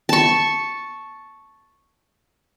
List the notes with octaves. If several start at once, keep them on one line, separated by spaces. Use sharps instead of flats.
A5 C#6